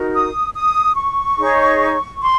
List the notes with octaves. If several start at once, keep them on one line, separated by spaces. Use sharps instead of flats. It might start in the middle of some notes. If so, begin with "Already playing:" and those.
Already playing: D#4 F#4 A#4
D#6
D#6
C#6
D#4 G#4 C#5
C6